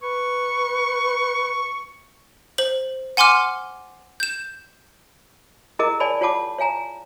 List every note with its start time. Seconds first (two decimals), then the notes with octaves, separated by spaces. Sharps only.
0.03 B4 C#6
2.58 C5 F#7
3.17 F#5 G#5 C6 D6 F6
4.20 G6 E7
5.79 E4 G#4 A#4 D#5 A#5 D6
6.00 C#5 D5 G#5 A5 B5
6.21 F4 C#5 F#5 A5 D6
6.58 C#5 F5 G#5 A#5